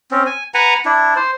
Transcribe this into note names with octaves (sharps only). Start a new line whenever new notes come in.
C4 C#4
G#5
B4 F#5 G#5 A#5
D4 E4
C5